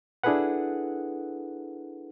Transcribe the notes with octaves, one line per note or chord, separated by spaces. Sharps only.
D4 E4 G#4 A4 B4 F#5